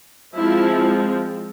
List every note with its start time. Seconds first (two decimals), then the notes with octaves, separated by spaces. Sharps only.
0.36 F3 G#3 C4 E4